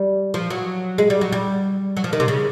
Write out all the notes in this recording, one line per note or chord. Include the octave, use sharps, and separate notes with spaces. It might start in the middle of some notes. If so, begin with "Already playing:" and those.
Already playing: G3
F3
F#3
G#3
G3
F#3
G3
F#3
F3
D#3
C3
C#3